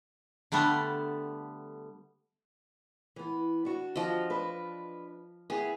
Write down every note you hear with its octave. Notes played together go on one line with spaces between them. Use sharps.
D3 G3 A3 B3
E3 B3
D4 F#4
F3 D#5
D4 B4
B3 E4 G4 G#4